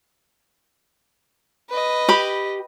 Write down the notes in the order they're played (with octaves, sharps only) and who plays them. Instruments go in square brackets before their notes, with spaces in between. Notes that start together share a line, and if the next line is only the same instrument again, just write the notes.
[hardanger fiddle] B4 D#5
[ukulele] G4 B5